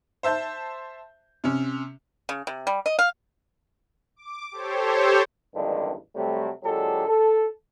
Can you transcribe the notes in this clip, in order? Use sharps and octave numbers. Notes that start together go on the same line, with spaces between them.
C5 E5 A5 G6
C3 C#4
C#3
C3
G3
D#5
F5
D6
G4 A4 C5 C#5
A1 E2 G2 D3 D#3 G#3
C3 F#3 G3 A3
A#2 D3 F#3 G#3 G4 A4
A4